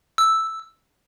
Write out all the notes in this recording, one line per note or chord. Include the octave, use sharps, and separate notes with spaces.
E6